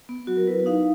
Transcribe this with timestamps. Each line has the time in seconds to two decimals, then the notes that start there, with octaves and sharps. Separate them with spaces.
0.09 B3
0.27 F#3 F#4
0.37 A#4
0.47 E4 B4
0.66 D#4 F5